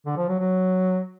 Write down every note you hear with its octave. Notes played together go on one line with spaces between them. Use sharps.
D3
F3
F#3
F#3